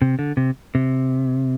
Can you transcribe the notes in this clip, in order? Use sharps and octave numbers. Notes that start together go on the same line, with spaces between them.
C3
D3
C3
C3